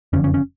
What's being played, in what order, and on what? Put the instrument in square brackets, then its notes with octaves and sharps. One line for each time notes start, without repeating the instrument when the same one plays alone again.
[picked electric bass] F#1 F2 D3 C#4
C#4
C#4